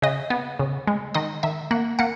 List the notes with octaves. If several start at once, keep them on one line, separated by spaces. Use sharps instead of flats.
C#3 D#5
B3
C#3
G#3
D#3 D#5
D#3 E5
A#3 F#5
A#3 F#5